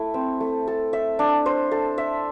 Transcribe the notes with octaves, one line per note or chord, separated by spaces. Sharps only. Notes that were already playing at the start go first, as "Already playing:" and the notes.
Already playing: A3 E4
C4
A3
A4
E5
D4
C5
A4
E5